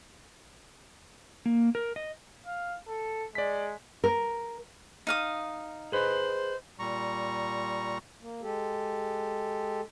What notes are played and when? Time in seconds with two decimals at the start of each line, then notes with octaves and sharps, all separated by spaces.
1.46 A#3
1.75 A#4
1.96 D#5
2.46 F5
2.88 A4
3.35 G#3 D5 B6
4.04 A#4
5.07 D#4 F5 D#6
5.92 G#4 B4 C5 D#5
6.79 A#2 G3 A#5 C#6
8.21 A#3
8.42 G#3 G4 A4